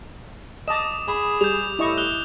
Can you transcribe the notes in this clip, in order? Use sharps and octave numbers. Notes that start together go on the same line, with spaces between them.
D#5 A5 D6 D#6 E7
G#4 B5
G3 G6 E7 F7
A2 E4 D#5 C#6
F#6 F7 G7